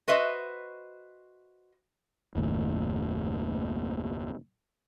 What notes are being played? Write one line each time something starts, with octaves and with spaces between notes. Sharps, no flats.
F#4 B4 C5 D#5 E5
F#1 D#2 A2